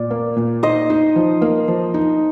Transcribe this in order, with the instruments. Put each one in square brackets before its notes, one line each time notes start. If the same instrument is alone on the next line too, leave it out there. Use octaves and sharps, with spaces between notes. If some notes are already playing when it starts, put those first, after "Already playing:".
Already playing: [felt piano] A#2 [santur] D5
[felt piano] A#3
A#2
[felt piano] D#4 [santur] C5 D#5
[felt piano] D#4
F3
A#3
F3
D#4